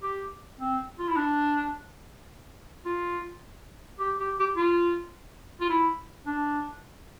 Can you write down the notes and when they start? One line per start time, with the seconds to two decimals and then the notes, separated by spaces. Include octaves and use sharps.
0.03 G4
0.60 C4
0.99 F4
1.08 E4
1.16 D4
2.85 F4
3.99 G4
4.19 G4
4.39 G4
4.56 F4
5.61 F4
5.69 E4
6.26 D4